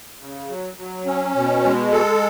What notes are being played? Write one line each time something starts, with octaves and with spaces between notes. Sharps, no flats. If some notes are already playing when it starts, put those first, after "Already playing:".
C#3
F#3
F#3
C#4
B2
G#3
A4